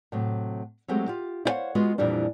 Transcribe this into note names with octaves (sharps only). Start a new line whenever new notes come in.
A2 C3 F#3
F#3 G#3 A3 C4 G4
F4 G4
E4 C5 C#5 D#5 F5 F#5
G#3 B3 F4 F#4
F2 A#2 E3 G3 D4